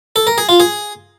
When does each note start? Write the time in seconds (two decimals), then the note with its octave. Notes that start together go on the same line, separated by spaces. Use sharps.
0.16 A4
0.27 A#4
0.38 G#4
0.49 F4
0.60 G#4